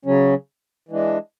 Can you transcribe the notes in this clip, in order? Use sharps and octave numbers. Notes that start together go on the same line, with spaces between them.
C#3 F#3 C#4
E3 G#3 D4